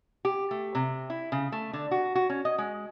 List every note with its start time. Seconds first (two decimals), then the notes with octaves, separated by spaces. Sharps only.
0.25 G4
0.51 A3
0.75 C3
1.10 E4
1.32 C#3
1.52 A3
1.73 D3
1.91 F#4
2.15 F#4
2.30 C#4
2.45 D#5
2.58 G#3